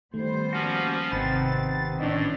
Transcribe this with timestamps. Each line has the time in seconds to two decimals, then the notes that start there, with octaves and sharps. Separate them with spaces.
0.14 D#3 G3 A3 B3 C5
0.53 F3 A#3 C#4 F#4
1.12 G#1 C3 D#3 B3 C4 A5 B5 A6
2.00 A2 E3 C#4 D4 D#5